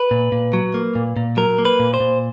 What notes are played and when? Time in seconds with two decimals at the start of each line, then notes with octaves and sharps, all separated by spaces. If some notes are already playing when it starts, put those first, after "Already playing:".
Already playing: B4
0.11 A#2
0.32 A#2
0.53 F#3
0.74 A#3
0.95 A#2
1.17 A#2
1.37 F#3 A#4
1.59 A#3
1.65 B4
1.80 A#2
1.94 C5
2.00 A#2